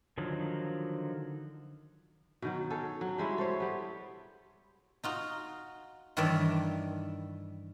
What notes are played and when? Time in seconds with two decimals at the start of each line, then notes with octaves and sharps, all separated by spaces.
0.18 D3 D#3 F3 F#3
2.42 B2 D#3 F#3
2.70 C#4 G#4 A4
3.01 F#3
3.18 G3 G#3 E4 C#5
3.38 A4 C5 C#5
3.60 G3 B3
5.04 D#4 F4 F#4
6.17 G2 D#3 E3 C#5 D5 E5